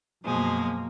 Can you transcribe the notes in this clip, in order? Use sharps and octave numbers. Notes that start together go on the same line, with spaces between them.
F#2 B2 F3 G#3 A#3